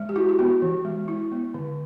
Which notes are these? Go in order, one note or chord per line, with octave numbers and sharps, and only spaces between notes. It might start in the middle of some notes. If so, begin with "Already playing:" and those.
Already playing: G#3
G4
E4 F#4
G4
B3 F#4
E3
G#3
E4
B3
D3